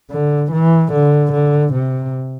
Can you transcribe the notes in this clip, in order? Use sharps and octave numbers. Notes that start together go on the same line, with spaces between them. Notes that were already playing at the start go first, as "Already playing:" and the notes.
D3
E3
D3
D3
C3